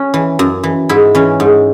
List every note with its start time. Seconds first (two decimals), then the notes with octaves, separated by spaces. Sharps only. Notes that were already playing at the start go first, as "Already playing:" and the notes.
Already playing: C#4
0.14 E3
0.39 F#2
0.63 E3
0.89 G#2 E4
1.15 E3 C#4
1.40 G#2